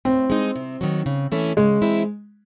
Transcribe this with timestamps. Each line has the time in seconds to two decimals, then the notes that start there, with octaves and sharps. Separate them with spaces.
0.05 A2 C4
0.30 G#3 D#4
0.56 C3
0.81 D#3 F#3
1.06 C#3
1.32 E3 A3 C#4 E4
1.57 C#3 G#3
1.82 E3 C4 E4